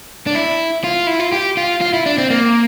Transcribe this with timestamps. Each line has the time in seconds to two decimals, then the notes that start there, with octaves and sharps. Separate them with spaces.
0.27 D4
0.35 E4
0.84 F4
1.07 E4
1.20 F4
1.32 G4
1.57 F4
1.81 F4
1.94 E4
2.06 D4
2.18 C4
2.30 A#3